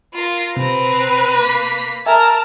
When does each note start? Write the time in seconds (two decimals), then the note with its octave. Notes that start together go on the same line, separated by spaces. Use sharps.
0.14 F4 A#4
0.56 C3 C4 B4 A#5
1.38 A#3 B6
2.06 A#4 E5 G#5 A5